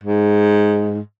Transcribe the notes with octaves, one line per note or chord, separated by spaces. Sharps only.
G#2